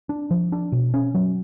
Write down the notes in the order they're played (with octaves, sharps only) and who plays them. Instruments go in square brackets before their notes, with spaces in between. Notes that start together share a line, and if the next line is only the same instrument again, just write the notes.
[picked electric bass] D4
F3
D4
B2
C#4
F#3